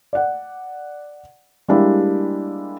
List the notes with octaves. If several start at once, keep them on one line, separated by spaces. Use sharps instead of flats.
D5 F#5
G3 G#3 A#3 D4 E4 G4